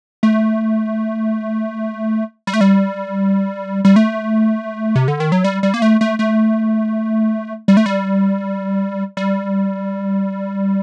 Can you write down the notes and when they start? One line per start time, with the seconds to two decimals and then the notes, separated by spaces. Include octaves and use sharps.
0.23 A3
2.47 G3
2.54 A3
2.61 G3
3.85 G3
3.96 A3
4.95 C3
5.08 D3
5.20 D#3
5.32 F#3
5.44 G3
5.63 G3
5.74 A#3
5.82 A3
6.01 A3
6.19 A3
7.68 G3
7.77 A3
7.86 G3
9.17 G3